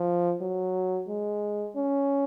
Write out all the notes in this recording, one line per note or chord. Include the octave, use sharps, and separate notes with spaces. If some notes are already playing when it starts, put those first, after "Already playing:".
Already playing: F3
F#3
G#3
C#4